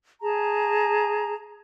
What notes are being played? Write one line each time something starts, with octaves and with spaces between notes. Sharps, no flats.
G#4 A5 A#5